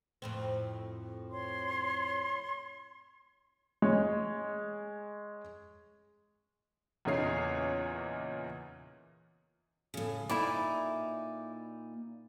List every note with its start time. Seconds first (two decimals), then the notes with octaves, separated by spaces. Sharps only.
0.22 F2 A2 C4
1.30 C#5 C6
3.82 G#3 C#5
7.05 E2 A#2 C#3 D#4 C#5 C7
9.94 A2 C#3
10.29 A#2 D#4 E4 D5